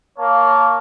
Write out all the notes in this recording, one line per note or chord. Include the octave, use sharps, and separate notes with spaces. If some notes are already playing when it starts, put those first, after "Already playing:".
A#3 C#5 F5 A5